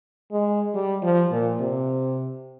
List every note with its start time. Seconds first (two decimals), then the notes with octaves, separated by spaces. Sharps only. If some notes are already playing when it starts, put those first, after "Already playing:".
0.31 G#3
0.74 G3
1.02 F3
1.32 A#2
1.60 C3